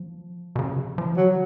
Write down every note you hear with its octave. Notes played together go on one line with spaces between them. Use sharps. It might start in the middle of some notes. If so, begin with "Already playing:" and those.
Already playing: F3
B2
C#3
F3
F3
D3 F#3